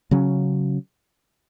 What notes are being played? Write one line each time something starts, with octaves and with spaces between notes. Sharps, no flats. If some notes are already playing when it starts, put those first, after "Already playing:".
C#3 F#3 C#4